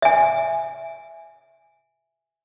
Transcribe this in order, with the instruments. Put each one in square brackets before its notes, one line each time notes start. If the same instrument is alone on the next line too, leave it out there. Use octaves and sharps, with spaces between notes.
[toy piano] E5 G#5